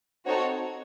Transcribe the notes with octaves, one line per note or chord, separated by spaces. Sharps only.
C4 D#4 F#4 A4 C#5